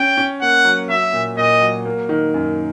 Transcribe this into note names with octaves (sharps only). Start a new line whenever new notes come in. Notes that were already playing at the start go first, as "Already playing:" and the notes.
Already playing: C#4 G5
C#4
A#3 F#5
F#3
F#3 E5
A#2
A#2 D#5
F#3
A#3
D#3
F#2